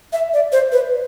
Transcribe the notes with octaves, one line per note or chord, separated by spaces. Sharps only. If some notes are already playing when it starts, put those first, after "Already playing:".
E5
D5
C5
B4